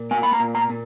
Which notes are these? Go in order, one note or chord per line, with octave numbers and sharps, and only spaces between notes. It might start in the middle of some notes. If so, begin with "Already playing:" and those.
Already playing: A#2
A#3 G#5
B5
A#5
A#2
A#5
A#2